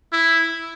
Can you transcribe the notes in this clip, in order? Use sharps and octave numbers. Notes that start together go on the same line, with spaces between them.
E4